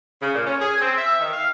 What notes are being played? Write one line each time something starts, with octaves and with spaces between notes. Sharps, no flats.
C#3
A#2
C#4
G#4
C4
E5
D#3
F5